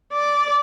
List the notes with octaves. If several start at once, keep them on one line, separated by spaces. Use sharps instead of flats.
D5